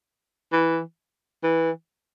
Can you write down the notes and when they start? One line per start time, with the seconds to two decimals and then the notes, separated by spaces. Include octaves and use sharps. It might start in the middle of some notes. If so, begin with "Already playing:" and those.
0.52 E3
1.43 E3